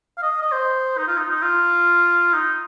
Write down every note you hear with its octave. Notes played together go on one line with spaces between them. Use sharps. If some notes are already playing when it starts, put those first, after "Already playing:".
F5
D#5
D#5
C5
D#4
F4
D#4
D#4
F4
D#4